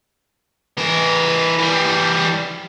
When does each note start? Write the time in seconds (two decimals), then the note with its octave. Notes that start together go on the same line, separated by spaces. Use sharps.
0.77 E3 A#4
1.58 E3 G3